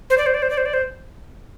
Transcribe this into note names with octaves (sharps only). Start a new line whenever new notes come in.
C5
D5
C5
D5
C5
D5
C5
D5
C5